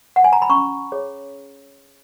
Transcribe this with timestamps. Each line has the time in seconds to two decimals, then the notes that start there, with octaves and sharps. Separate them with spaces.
0.16 F#5
0.24 G#5
0.33 A#5
0.42 B5
0.50 C#4 A#5 C#6
0.92 G#4 C#5